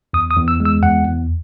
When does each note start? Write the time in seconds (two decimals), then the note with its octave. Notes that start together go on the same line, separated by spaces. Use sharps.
0.13 E2 D#6
0.31 D#6
0.37 E2
0.48 E6
0.60 G#3
0.65 E6
0.83 E2 F#5
1.05 E2